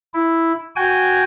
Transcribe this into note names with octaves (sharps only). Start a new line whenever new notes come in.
E4
F#4 G5 G#5